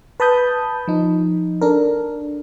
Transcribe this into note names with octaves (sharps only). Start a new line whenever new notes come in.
B4 A5 B5 D#6 G6
F3 D#4
D4 A4 A#4